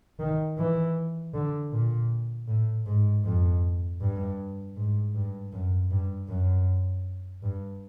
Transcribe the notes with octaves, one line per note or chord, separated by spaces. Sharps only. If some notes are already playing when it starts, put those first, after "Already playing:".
D#3
E3
D3
A#2
A2
G#2
F2
G2
G#2
G2
F#2
G2
F#2
G2